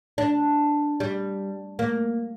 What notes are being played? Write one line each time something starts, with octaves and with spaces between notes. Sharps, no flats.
D4
G3
A#3